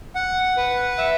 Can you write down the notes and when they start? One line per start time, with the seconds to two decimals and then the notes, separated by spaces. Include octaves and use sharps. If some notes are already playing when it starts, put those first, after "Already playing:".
0.15 F#5
0.57 B4
0.98 E5